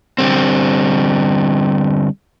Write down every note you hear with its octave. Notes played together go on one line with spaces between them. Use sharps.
D3 G3 C4